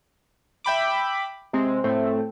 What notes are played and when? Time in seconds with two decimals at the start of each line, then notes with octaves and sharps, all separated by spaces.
0.64 E5 G5 B5 D6
1.53 C3 G#3 C4
1.84 A2 A3 C4